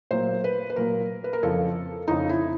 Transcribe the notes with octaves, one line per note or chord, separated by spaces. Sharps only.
A#2 F#3 A#3 C5
B4
B4
A#2 F#3 A#3 A#4
B4
A#4
F2 C#3 F3 A4
F2 C#3 F3 D#4
E4